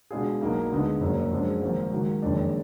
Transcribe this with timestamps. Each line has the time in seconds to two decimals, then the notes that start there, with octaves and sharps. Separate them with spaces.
0.11 B2 G#3 D4 F4 G#4
0.41 B1 B2 A#3 D#4
0.71 D2 D3 G#3 B3 D#4
1.01 F#1 F#2 F3 A#3
1.31 F#2 F3 G#3 D4
1.61 G#1 G#2 F3 A#3
1.92 G#2 D#3 F#3
2.22 F#1 F2 D#3 G#3 D4